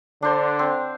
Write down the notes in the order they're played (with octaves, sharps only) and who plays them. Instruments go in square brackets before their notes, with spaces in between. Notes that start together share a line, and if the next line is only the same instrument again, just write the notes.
[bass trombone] D3 [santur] D4 C5 C6
[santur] C4